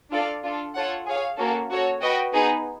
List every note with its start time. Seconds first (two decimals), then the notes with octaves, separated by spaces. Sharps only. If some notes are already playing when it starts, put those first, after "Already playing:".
0.11 D4 F4 A4 D5 F5
0.43 D4 F4 A4
0.75 F4 A4 C#5 F#5
1.06 G#4 C#5 F5
1.38 A#3 C#4 F#4 A4
1.70 F#4 A4 C#5
2.01 F#4 B4 D#5 G5
2.33 B3 D#4 G#4 B4